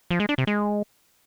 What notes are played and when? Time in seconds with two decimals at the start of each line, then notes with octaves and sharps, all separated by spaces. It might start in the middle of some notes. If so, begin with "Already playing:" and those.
0.11 F3
0.20 G#3
0.29 D4
0.38 C3
0.47 G#3